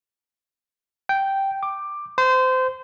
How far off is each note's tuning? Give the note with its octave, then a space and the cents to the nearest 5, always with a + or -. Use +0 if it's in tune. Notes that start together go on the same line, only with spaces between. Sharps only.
G5 -5
D6 +10
C5 -25